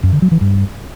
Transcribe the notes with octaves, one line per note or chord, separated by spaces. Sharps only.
F#2
D3
F#3
E3
G2